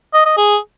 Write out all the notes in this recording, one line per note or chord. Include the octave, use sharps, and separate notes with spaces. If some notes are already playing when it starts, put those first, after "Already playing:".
D#5
D#5
G#4